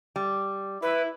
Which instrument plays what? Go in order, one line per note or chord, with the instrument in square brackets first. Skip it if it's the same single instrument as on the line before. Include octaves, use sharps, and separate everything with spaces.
[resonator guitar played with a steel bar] G3
[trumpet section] E4 [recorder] B4